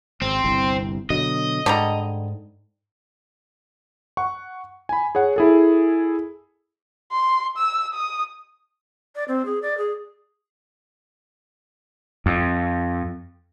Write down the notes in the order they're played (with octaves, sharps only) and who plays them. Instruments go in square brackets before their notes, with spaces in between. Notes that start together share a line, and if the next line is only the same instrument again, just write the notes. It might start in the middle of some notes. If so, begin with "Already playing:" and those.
[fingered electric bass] G#1 [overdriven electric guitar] C4
[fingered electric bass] G1 C2
[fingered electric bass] B2 D3 F#3 [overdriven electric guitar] D#5
[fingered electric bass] G#2 [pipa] D3 G3 A#5
[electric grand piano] F#5 C#6
G#5 B5
G#4 C#5 F#5
E4 G#4 A4
[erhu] C6
E6
D#6
[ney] D5
C4
G#4
D5
G#4
[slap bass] F2